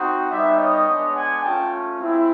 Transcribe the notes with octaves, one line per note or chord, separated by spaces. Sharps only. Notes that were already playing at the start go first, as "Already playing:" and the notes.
Already playing: C4 D#4 F#4
G3 B3 D#4 D5 E5
C#5 D#5
G#3 B3 D4
F#5 G#5
A3 C#4 F4 G5 A5
G#3 C4 E4